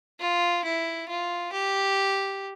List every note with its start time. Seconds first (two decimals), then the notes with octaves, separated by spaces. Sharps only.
0.20 F4
0.65 E4
1.09 F4
1.52 G4